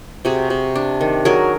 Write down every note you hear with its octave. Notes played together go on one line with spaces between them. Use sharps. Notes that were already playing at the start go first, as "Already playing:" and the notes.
C3 F#4 G#4
C3
D4
D#3
F#3 G#4 A#4